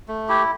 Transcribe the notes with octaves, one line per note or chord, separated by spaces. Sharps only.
A3
E4 G4